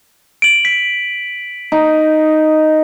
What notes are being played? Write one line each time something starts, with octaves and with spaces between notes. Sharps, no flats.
D7 F#7
B6
D#4